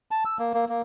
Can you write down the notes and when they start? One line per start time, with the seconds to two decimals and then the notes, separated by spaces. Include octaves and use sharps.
0.11 A5
0.25 E6
0.39 A#3
0.54 A#3
0.69 A#3